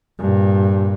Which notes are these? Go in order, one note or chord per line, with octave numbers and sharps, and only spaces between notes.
G2 A#2